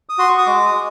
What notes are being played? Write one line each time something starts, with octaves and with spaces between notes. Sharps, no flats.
D#6
F#4 C6
C#6
D#6
G#3 D6
D#6
G#3